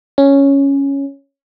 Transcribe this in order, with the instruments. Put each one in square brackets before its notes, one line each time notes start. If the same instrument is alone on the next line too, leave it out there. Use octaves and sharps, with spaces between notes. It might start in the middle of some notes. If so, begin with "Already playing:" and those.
[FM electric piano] C#4